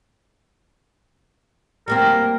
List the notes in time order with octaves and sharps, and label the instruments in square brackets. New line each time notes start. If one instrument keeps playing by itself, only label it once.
[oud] G3 A#3 C4 [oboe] A#4